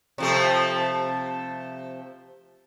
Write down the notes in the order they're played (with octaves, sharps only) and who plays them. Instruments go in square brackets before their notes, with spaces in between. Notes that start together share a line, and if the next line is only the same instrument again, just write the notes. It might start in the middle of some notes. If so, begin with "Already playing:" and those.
[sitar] C3 F3 A3